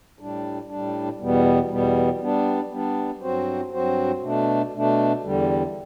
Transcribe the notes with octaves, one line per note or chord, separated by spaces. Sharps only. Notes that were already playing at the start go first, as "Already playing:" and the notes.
A2 G3 D4
A2 G3 D4
E2 B2 G3 B3
E2 B2 G3 B3
G3 B3 D4
G3 B3 D4
G2 F#3 C4 F#4 C5
G2 F#3 C4 F#4 C5
B2 A3 D4
B2 A3 D4
E2 D3 G3